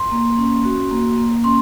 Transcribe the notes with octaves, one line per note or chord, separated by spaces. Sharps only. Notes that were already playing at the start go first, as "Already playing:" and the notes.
Already playing: C6
A#3
C#4
F#4
A#3
A#3
C#4 C6